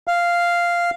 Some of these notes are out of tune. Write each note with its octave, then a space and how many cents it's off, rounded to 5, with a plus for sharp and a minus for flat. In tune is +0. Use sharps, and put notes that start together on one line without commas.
F5 -5